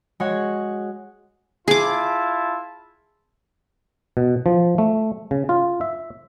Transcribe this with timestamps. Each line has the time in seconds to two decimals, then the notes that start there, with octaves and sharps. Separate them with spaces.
0.20 G#3 F#4 C#5 F#5
1.68 E4 F4 G#4 A5 D6
4.17 B2
4.46 F3
4.78 A3
5.31 C#3
5.49 F4
5.81 E5